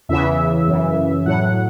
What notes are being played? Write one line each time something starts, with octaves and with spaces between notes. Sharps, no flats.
E2 C#3 E3 E5
F#2 C#3 E3
A2 F#3 F#5